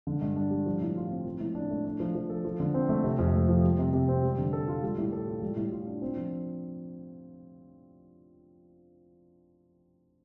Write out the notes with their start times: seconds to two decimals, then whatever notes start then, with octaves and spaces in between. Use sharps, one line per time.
0.07 D3
0.21 G2
0.36 D4
0.51 G3
0.66 F3
0.81 A2
0.96 F4
1.10 C4
1.25 F3
1.40 A2
1.55 D4
1.70 A3
1.85 D4
2.00 F3
2.15 F3
2.30 A4
2.45 F3
2.60 D3
2.74 C4
2.89 A3
3.04 C3
3.19 F2
3.34 A3
3.48 F3
3.64 G3
3.79 C3
3.93 C3
4.08 C4
4.23 G3
4.38 D3
4.53 A4
4.68 F4
4.83 G3
4.98 A2
5.12 A4
5.27 F4
5.42 G3
5.56 A2
5.72 F4
5.87 D4
6.02 C4
6.16 F3